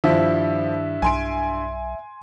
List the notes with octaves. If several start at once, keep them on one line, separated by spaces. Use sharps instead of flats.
G2 D#3 F3 E4 E5
B1 G#5 C6 D7